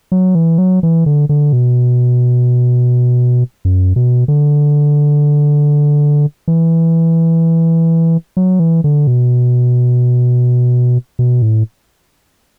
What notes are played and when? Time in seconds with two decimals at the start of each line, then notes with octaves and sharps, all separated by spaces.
0.12 F#3
0.35 E3
0.58 F#3
0.83 E3
1.06 D3
1.29 D3
1.53 B2
3.65 F#2
3.96 B2
4.28 D3
6.48 E3
8.37 F#3
8.60 E3
8.84 D3
9.07 B2
11.19 B2
11.42 A2